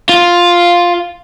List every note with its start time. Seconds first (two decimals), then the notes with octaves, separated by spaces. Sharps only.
0.09 F4